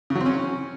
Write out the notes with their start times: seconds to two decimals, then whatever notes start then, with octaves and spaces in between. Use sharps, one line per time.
0.10 C#3
0.15 F#3
0.21 C4
0.26 C#4